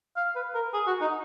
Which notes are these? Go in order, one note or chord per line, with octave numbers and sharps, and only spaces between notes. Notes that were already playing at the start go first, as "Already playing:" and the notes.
F5
B4
A#4
G#4
F#4
D#4